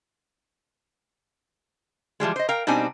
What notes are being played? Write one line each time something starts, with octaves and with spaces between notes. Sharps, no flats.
E3 F3 G3 G#3
C5 D#5
A#4 F5 G5 A#5
B2 G3 C4 D4 D#4 G#5